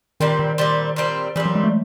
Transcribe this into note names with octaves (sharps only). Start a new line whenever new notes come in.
A#2 D#3 G3 C4
D#3
A#2 G3 C4
A#2 G3 C4
A#2 E3 G3 C4
F#3
G#3
A3